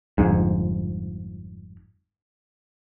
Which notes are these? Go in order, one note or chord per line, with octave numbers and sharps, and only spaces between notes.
G1 F2 G#2